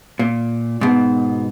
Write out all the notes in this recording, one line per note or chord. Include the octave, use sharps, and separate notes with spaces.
A#2
G#2 B2